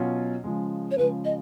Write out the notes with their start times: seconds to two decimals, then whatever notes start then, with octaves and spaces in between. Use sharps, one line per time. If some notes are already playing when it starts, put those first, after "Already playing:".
Already playing: B2 F#3 C#4 F4
0.44 C#3 F3 G#3
0.91 C#5
0.98 C#3 F3 G#3 B4
1.25 D#5